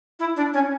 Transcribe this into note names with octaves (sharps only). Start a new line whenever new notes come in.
E4
D4
C#4